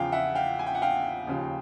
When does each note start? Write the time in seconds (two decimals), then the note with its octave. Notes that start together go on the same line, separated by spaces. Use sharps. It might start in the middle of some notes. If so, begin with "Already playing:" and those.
Already playing: E2 C#3 F3 F5 G5
0.12 E5 F#5
0.35 F5 G5
0.59 G#5
0.66 G5
0.75 F#5
0.82 F5 G5
1.27 D#2 C#3 F3